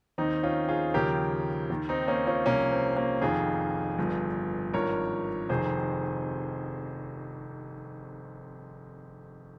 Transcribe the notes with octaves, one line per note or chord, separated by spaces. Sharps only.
D#2 D#3 C4 D#4
C#4 F4
F4 G#4
D#2 C#3 F3 G4 A#4
D#2 D#3
C4 D#4
A#3 C#4
C#4 F4
C2 C3 F3 A#3 C#4
C4
A#3 C#4
F1 F2 D#3 F4 G#4
G1 G2 F3
G#1 G2 F3 A#4 C#5
F1 F2 C3 D#3 G#4 C5